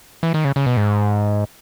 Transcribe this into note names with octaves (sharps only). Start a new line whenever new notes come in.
E3
D#3
C#3
C#3
B2
G#2